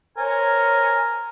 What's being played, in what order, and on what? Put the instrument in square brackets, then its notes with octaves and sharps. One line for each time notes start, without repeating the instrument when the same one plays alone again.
[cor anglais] A#4 [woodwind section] C5 C#5 G#5